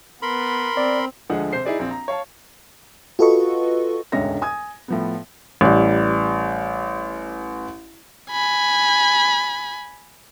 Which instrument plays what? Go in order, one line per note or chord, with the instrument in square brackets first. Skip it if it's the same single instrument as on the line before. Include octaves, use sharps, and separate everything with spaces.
[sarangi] B3 [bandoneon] A#4 B5 C6
[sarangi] C4 [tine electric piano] D5
[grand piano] D2 D3 F3 G#3 G#4 F#5
C3 C5 C7
D#4 E4 G#4 D5
A#1 C4
A#5
C#5 F5 A5
[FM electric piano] F4 F#4 A4 B4 D#5 C#6
[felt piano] E1 D2 G#2 C#3 C#5 A#6
G#5 D#6 G#6
A2 F3 B3
A1 G3
[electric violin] G#5 B5